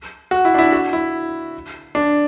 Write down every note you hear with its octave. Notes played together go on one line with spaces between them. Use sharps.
F#4
E4
D4
E4
F#4
E4
D4